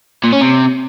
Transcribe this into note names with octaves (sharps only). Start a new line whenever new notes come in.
A#2
C#4
C3